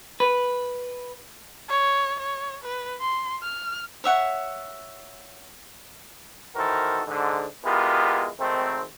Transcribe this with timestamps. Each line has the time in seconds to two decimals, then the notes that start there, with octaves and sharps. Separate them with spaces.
0.20 B4
1.69 C#5
2.20 C#5
2.64 B4
3.01 C6
3.43 F6
4.04 C#5 E5 F#5
6.56 D#3 E3 F#4 A4 A#4 C5
7.07 G#2 D3
7.65 G#3 B3 E4 F4 G4 A#4
8.40 G#1 D#3 A3 C4